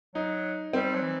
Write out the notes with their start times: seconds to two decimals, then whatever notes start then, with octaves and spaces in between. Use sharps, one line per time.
0.15 F#3 D#4
0.73 G3 C4
0.95 F#3
1.02 E3